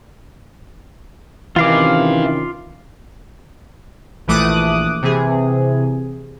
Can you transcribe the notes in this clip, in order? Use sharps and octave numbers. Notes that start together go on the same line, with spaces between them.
C3 D#3 E3 C#4 F4 F5 D6
A#1 E3 A3 D6 D#6 F#6
C3 E3 G#4